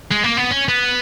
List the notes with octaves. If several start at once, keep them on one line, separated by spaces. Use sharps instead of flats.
G#3
A#3
B3
C#4
B3